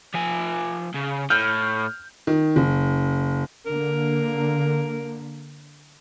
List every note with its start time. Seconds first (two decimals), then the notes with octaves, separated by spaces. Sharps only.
0.14 F3 G#5
0.95 C#3
1.30 A2 F6 G6
2.27 D#3
2.56 F#1
3.66 D3 A#3 A#4